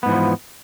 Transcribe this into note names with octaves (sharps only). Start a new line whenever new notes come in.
G#2 E3 F3 B3